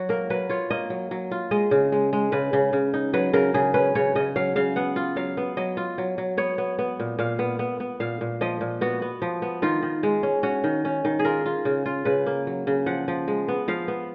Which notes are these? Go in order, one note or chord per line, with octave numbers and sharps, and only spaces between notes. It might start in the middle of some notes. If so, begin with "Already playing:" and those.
Already playing: F#3 F#4
A#3 A#4
F#3 B4
F4 C#5
A#3 D#5
F#3
F#3
F4
G#3 D#5
C#3
G#3
G#3
C#3 B4
C#3
C#3
D#4
F#3 B4
C#3 A#4
C#3 G#4
C#4 B4
C#3 C#5
C#3 D#5
F#3 F5
C#3 F5
B3 F#5
F4
F#3 F5
B3
F#3 D#5
F4
F#3
F#3
B3 C#5
B3
B3
A#2
A#2 F5
B3
B3
B3
A#2 F5
A#2
F3 D#5
A#2
B3 F#4
B3
F3
B3
D#3 F4
D#3
G#3
C#4
C#4 F#4
D#3
C#4
D#3
G#4
F4 A#4
F4
C#3
F4
C#3 B4
A#3
F#3
C#3
F3 F#5
F3
G#3
B3
F3 F5
B3